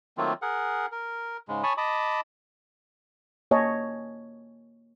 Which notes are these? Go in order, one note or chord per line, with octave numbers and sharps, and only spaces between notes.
D#3 F#3 A3 A#3 C4 F4
G#4 A#4 F#5
A#4
G#2 C#3 G#3
C#5 G#5 A5 B5 C#6 D#6
D#5 A5 B5 D6 D#6
A#3 C#5 D#5 G#5 A5